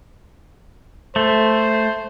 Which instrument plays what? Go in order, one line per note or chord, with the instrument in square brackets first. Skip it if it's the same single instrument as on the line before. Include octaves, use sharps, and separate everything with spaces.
[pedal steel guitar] A3 [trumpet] C5